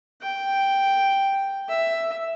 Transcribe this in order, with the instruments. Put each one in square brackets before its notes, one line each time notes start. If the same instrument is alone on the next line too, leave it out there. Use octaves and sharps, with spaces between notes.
[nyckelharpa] G5
E5